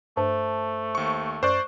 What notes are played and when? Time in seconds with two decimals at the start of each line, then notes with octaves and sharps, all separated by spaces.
0.17 G2 A3 C5 A5
0.95 D#2 C#6
1.43 F#2 C5 D5 C#6 F#6